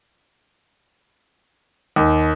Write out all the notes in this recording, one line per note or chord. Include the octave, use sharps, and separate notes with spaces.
D#2